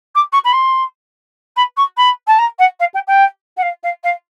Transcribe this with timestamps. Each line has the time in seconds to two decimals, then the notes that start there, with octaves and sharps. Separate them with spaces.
0.15 D6
0.32 C#6
0.44 B5
0.52 C6
1.56 B5
1.77 C#6
1.97 B5
2.27 A5
2.38 A#5
2.59 F#5
2.80 F5
2.94 G5
3.07 G5
3.57 F#5
3.62 F5
3.83 F5
4.03 F5